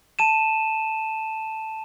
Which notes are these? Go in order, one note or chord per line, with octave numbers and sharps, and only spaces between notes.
A5 D#7 E7